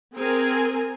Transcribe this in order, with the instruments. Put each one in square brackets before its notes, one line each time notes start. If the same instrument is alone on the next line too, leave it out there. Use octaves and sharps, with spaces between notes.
[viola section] C4 G#4 A#4 G#5